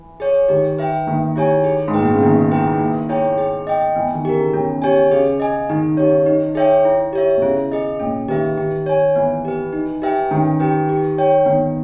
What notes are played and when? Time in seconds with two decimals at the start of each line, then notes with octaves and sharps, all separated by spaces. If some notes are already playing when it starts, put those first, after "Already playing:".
Already playing: E3
0.20 G#4 C#5
0.48 D#3 G4
0.79 B4 E5 G5
1.07 D#3 A#3
1.36 E4 G4 C#5 G#5
1.64 G#4
1.88 G#2
1.93 A#2 B4 G5
2.05 B2
2.13 C#3
2.23 D#3 A#3
2.51 E4 G#4 B4 G5
2.80 A#3
3.09 E4 G#4 C#5 G5
3.38 G#4
3.67 D#5 G5
3.95 E3 B3
4.14 D#3
4.25 G4 A#4
4.34 C#3
4.53 B2 C#4
4.82 G4 C#5 G#5
5.11 C#3 G#4
5.40 D#5 G#5
5.70 D#3 D#4
5.97 G4 C#5
6.26 D#4
6.55 G#4 C#5 E5 G5
6.85 E4
7.13 G4 C#5 E5
7.37 B2
7.42 C#3 E4
7.72 G#4 D#5
8.00 A#2 C#4
8.28 D#3 G4 B4 E5
8.57 D#3 G4
8.86 C#5 G#5
9.16 E3 B3
9.45 G4 B4
9.73 D#4
10.02 G4 B4 E5 G5
10.31 D#3 C#4
10.60 G4 B4 G5
10.89 G4
11.18 C#5 G5
11.46 D#3 B3